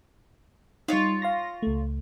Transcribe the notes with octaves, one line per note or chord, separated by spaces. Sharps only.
G3 D#4 F4 C#5
F5 C6 A#6
C#2 A3